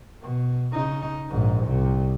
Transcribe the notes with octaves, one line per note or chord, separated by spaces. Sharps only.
B2
C#3 D#4
A#1 G#2
C2 C3